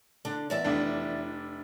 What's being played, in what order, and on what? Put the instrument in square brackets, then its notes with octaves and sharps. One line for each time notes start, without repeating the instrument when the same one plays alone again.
[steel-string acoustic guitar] D3 D4
E2 D5 E5
[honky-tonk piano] F1 D4 E4